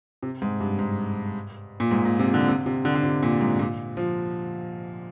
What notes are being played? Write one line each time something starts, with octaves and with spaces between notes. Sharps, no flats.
C3
G#2
G2
G#2
A#2
G#2
A#2
C3
D3
C3
C3
D3
D3
C3
A#2
G#2
A#2
F3